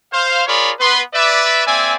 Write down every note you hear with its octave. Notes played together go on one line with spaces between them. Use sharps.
C5 F5
F4 G#4 A#4 C#5 D5 B5
B3 B4 C6
B4 D5 E5
A#3 C4 D5 E5 G#5